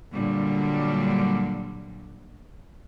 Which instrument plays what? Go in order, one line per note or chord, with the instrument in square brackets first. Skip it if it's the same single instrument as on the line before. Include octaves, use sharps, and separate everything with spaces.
[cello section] A#2 D3 F#3 G3